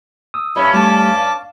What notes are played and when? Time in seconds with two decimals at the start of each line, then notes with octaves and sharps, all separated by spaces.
0.34 D#6 E6
0.56 G2 C#4 E4
0.74 G3 A3 D4 A5 D6
1.16 F5